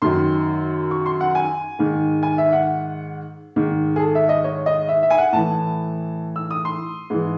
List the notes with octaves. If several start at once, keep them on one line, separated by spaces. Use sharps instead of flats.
F#2 D#3 C6
C#6
C6
F#5
G#5
G#2 D#3
G#5
E5
F#5
G#2 D#3
G#4
A4
E5
D#5
C#5
D#5
E5
E5
G#5
F#5
A2 E3 A5
E6
D#6
C6
G#2 E3